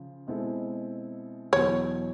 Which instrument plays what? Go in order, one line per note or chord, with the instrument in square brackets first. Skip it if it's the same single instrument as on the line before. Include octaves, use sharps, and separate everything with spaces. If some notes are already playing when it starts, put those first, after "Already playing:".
Already playing: [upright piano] C#3 F3
B2 G#3 C4 E4 A4
[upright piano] E2 B2 F#3 [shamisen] C#5